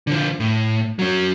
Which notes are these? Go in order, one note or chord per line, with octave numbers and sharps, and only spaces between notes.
D3 F3
A2
F#3 C#4